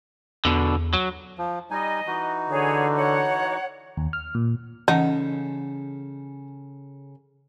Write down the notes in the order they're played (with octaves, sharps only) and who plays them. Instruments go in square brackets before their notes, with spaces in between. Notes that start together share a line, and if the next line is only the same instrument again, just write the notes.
[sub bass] E2 [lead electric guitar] B2 D3
[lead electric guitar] F#3
[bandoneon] F3
[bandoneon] G3 D#4 G#5 [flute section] D#5
[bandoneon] E3 D#4 F#4
[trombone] D3 [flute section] G#4 C#5
[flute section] C#5 F#5
[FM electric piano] D#2
F6
A#2
[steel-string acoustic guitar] C#3 A4 [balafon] E3 F#5 A5 [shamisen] D#4